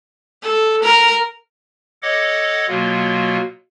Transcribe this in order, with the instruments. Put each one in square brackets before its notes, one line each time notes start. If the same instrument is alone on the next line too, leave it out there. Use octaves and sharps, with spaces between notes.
[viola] A4
A#4
[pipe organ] A4 C#5 D#5 F#5 D6
B2 F#3 A#3 F4